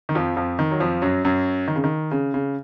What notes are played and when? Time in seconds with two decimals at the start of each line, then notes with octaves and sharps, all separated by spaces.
0.09 D#3
0.15 F2 F3
0.37 F2 F3
0.59 D#3
0.71 F#3
0.80 F2 F3
1.02 F#2 F#3
1.25 F#2 F#3
1.68 D#3
1.76 C#3
1.84 D#3
2.11 C#3
2.34 C#3